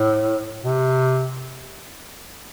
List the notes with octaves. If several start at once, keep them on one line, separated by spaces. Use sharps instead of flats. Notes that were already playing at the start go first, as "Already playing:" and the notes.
Already playing: A2
C3